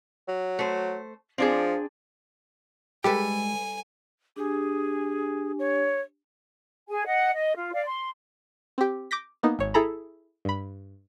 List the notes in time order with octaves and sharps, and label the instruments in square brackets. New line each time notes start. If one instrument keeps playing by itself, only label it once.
[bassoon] F#3
[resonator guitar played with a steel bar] A3 C5
[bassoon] F3 [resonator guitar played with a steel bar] C4 D4 G#4
[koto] G3 A4 B4 [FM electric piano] G#3 [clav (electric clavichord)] G4 [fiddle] G#5
[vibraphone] D4 G4 G#5 [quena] G#4
[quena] C#5
[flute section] G#4 G#5
D#5 F#5
D#5
F4
D5 F5
C6
[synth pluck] C4 G4
D6 G6 A#6 B6
A#3 B3 D#4
G#1 C#5
E4 G#4 A4 A#5 B5
G2 B5